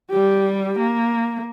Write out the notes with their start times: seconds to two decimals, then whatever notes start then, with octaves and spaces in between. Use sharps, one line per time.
0.10 G3 G4
0.79 A#3